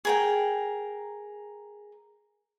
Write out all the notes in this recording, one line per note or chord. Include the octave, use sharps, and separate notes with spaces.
G#4 A#4 G5